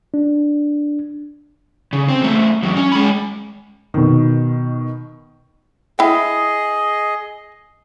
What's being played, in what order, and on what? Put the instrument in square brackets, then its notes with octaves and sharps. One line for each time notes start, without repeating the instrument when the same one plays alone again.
[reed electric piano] D4
[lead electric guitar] C#3
C4
E2 A3
E2 F#3
C#4
G#3 B5
[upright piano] B2 D#3
[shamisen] E4 G5 [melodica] G#4 D#5